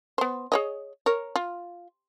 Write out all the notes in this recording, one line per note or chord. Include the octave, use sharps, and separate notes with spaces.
B3 C5
G#4 C#5 D#5
A#4 C#5
F4